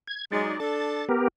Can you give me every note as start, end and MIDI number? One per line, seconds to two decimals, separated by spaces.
0.08 0.25 92
0.32 0.55 54
0.32 0.55 56
0.32 0.60 63
0.32 0.60 74
0.60 1.06 62
0.60 1.06 69
0.60 1.05 93
1.09 1.28 59
1.09 1.28 67
1.09 1.28 70